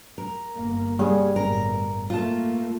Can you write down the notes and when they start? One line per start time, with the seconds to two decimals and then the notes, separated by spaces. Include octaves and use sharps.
0.18 A#4
0.55 G1 A#3
0.99 G3 C#4 G#4
1.36 G1 A2 A#4
2.10 A3 A#3 F4 A5